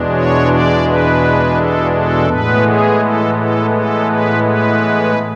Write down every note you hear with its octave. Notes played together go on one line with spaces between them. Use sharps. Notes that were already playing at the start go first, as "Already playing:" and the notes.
Already playing: E2 B2 G#3 D4
C#5
D5
B4
A4
A4
A2 E3 G#3 B3 B4
G#4
A4
A4
A4
B4
B4